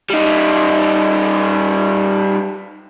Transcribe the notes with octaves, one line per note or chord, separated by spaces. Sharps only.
G3 D#4